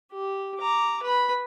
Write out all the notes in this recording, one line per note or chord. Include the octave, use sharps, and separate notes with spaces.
G4
A#5 D6
B4 B5